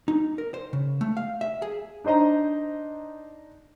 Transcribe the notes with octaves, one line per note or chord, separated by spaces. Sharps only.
D#4
A#4
C5
C#3
A3
F5
E5
G#4
D4 D#4 C5 D#5 A#5